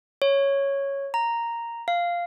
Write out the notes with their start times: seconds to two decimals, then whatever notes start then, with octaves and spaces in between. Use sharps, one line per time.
0.22 C#5
1.14 A#5
1.88 F5